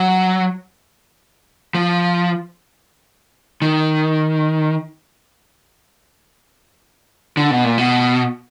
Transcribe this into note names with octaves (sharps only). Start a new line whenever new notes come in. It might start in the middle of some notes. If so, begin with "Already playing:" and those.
Already playing: F#3
F3
D#3
D3
B2
A#2
B2